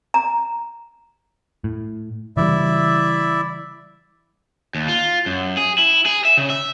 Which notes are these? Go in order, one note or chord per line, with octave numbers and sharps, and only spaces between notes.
A#5
A2
C#3 E3 G3 E4 D5 E5
D#2
F4
F#2
G#4
E4
G#4
E5
C#3
E5